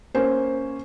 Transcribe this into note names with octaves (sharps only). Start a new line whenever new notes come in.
A#3 C#4 C5